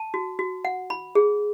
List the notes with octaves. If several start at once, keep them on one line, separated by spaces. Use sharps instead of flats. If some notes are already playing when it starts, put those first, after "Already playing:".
Already playing: A5
F#4
F#4
F#5
B5
G#4